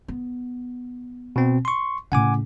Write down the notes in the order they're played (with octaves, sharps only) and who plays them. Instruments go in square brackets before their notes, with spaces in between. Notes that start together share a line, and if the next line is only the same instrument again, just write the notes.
[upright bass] B3
[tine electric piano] B2 C4
C6 C#6
[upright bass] A2 C#3 [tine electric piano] F#5 G#5 D6